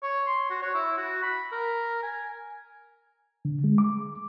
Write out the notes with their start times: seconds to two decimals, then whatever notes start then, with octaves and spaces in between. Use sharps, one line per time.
0.03 C#5
0.27 C6
0.51 F#4
0.62 C#5
0.75 E4
0.98 F#4
1.23 B5
1.52 A#4
2.03 G#5
3.45 D3
3.64 G#3
3.78 D6